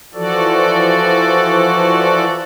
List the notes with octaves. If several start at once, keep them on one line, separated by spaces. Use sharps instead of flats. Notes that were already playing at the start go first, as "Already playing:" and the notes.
E3 F3 F#4 A4 D5